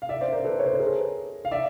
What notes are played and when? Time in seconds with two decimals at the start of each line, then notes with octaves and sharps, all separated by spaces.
0.02 F5
0.09 D5 E5
0.21 C5 D5
0.32 A#4 C5
0.45 A4 B4
0.59 C#5
0.66 C5
0.73 B4
0.80 G#4 A#4
1.45 F5
1.51 D5 E5